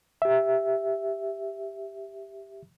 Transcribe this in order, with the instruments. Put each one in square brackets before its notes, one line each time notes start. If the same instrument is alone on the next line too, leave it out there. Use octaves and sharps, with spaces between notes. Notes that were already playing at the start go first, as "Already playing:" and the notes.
[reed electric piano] G4 E5